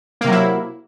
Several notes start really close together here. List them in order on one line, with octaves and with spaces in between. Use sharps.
A#3 C3 F#3 E4